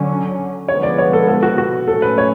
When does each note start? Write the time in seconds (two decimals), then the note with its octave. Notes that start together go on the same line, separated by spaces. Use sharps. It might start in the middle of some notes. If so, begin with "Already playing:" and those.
Already playing: D3 F#3 C#4
0.68 D3 F3 G#3 B3 C#5
0.83 D5
0.98 C#5
1.13 A4
1.28 A4
1.43 F#4
1.58 F#4
1.88 A2 F#3 A3 C#4 A4
2.02 B4
2.18 C#5